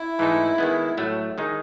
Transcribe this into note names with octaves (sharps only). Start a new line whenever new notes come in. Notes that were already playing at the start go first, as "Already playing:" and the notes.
Already playing: E4
G#2 E3 A3 D#4 A4
D#3 G#3 B3
A2 F#3 A3
D#3 G#3 D#4